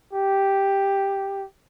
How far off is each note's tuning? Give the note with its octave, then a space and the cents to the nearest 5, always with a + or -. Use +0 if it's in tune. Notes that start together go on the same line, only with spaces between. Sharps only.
G4 +0